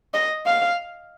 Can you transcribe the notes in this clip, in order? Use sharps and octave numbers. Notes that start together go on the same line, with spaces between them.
D#5
F5